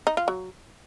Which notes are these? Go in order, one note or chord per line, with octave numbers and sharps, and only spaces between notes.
D#4
F4
F#3